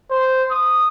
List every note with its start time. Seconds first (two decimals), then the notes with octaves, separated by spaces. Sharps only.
0.11 C5
0.51 D#6